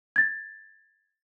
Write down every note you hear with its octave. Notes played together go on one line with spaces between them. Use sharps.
G#6 A6